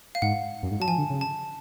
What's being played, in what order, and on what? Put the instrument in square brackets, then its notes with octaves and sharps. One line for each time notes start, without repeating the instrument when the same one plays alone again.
[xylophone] F5
[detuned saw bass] G#2 [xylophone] F#5
[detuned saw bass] F#2
G#2
[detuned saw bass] F#3 [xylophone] A5
[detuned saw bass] F3 [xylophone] G#5
[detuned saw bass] D3
C#3
[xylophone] A5